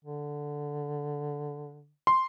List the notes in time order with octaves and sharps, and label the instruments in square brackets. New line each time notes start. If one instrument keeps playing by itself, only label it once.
[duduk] D3
[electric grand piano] C6